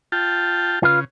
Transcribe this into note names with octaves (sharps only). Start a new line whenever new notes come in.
F4 G5 A5
C#3 F4 B4 F5